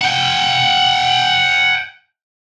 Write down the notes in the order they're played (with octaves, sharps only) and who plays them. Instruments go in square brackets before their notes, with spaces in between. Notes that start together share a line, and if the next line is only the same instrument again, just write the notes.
[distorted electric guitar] F#5 G5